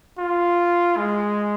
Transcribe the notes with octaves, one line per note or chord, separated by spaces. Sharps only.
F4
G#3